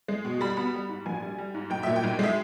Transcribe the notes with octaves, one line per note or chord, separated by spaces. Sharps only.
G#3
B2
G3 B5
B3 B5
G3
G#2
A#1 G#5
G3
G3
G#2
B1 G5
A#2 E5
G5
B1
G#3 E5